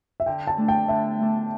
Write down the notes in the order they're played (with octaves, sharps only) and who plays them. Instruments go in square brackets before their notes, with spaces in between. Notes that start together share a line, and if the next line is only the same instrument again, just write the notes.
[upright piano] E5
[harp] D3 [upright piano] G5
[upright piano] A5
[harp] A3 D4
[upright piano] G5
[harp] D3 [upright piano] E5
[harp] A3 D4